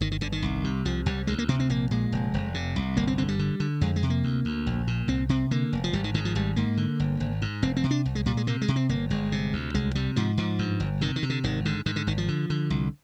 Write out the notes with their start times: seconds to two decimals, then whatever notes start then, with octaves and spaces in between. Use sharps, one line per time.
0.01 G1 D#3
0.11 D#3
0.21 G1 D3
0.32 D#3
0.42 C2
0.64 C3
0.85 C2 F3
1.06 C2 G3
1.27 D2 G#3
1.38 A#3
1.49 C3 C4
1.60 C4
1.69 A#1 A#3
1.91 A#2 G#3
2.12 F1
2.34 F1
2.54 C3
2.76 C2
2.97 G1 A#3
3.07 C4
3.18 D3 C4
3.28 G3
3.39 D3
3.60 D3
3.81 F2 G#3
3.96 G#3
4.03 C3
4.10 A#3
4.23 D2
4.45 D2
4.67 A#1
4.87 A#2
5.08 C2 C4
5.29 C3 C4
5.51 D3 A#3
5.73 F1
5.84 F3
5.93 G#1 G3
6.04 D#3
6.14 G#2 D#3
6.25 F3
6.35 G#1 G3
6.56 G#2 A#3
6.77 D3
7.00 G1
7.20 G#1
7.42 G#2
7.62 F1 C4
7.77 C4
7.84 C3
7.91 D4
8.05 C2
8.15 G#3
8.26 A#2 G3
8.37 G#3
8.47 C3 A#3
8.61 G#3
8.68 C3
8.76 C4
8.89 G1 A#3
9.10 G1 G#3
9.32 C3
9.53 D2
9.74 C2 G#3
9.95 C3 G3
10.16 G#2 F3
10.37 G#2 F3
10.59 G2
10.80 G1
11.01 C3 D#3
11.16 D#3
11.23 C3
11.30 D3
11.44 G#1 D#3
11.65 G#2 D3
11.86 G#2 D#3
11.96 D3
12.07 G#1 D#3
12.18 F3
12.28 D3
12.50 D3
12.70 C2